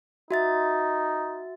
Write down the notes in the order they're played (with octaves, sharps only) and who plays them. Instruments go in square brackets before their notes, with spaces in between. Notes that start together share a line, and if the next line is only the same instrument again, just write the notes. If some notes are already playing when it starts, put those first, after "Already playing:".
[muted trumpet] D#4 [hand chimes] F#4 E5 A6